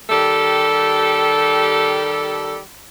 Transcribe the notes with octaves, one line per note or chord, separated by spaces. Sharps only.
D#3 G3 G4 A4